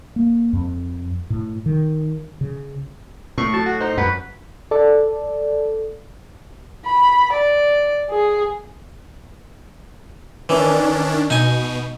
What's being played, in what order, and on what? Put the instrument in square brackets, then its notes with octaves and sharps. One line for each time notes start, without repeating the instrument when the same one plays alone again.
[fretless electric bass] A#3
F2
A2
D#3
C#3
[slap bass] A2 [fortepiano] A3 [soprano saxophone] C#6
[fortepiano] F#3 [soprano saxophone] A5
[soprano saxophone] F#4
[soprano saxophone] D#4 [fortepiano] C5
[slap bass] F#2 [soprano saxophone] B4 [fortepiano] F#5
[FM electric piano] A4 D5
[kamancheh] B5
D5
G#4
[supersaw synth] D#3 C#4 D4 [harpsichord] E3
[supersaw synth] B2 [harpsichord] D#4 G#5